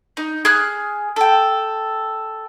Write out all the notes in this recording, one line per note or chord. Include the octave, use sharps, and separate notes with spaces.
D#4
G#4 F6 F#6
A4 G5